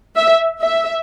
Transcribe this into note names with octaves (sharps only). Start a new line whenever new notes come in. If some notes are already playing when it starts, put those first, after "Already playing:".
E5
E5